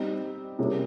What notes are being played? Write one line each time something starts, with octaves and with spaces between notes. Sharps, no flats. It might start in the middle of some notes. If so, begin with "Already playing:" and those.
Already playing: G3 C4 D#4
C3 G3 A#3 C#4 G#4